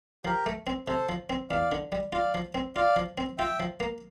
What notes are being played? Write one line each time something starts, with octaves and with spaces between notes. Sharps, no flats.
F3 G4 A#4
A3
C4
C3 A4 C5
F3
C4
E2 D5 F5
D3
G3
F4 D5 F5
F3
C4
F4 D5 F5
F3
C4
F4 E5 G5
F3
A#3